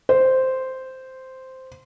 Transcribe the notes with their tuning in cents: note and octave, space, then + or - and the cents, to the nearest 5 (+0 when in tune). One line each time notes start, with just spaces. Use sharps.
C5 -5